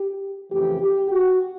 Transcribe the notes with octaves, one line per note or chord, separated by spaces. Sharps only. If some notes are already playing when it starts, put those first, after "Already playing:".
Already playing: G4
F2 C#3 E3 A3 G4
G4
F#4